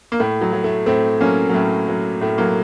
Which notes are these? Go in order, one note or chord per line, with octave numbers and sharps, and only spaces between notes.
A#3
A2 A3
F#3
F#3
A3
A2 A3 C4
F#3 A#3 C#4
F#3
A2 A3
F#3
A2 A3
F#3 A#3